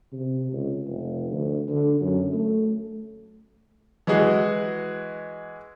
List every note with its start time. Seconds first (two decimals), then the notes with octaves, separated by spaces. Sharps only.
0.12 C3
0.52 C#2
0.87 F1
1.31 D2
1.68 D3
2.01 F#2
2.33 A3
4.07 E3 G#3 F#4 G#4